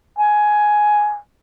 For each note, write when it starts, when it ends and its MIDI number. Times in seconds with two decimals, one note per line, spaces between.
0.18 1.18 80